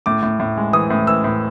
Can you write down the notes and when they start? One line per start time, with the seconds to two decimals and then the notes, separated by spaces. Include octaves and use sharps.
0.06 A2 D6
0.23 A2
0.40 A2
0.57 G#3
0.73 E3 D#6
0.90 A2
1.07 E3 E6
1.24 A2